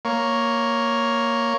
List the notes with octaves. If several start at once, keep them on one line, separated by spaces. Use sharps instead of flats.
A#3 C#5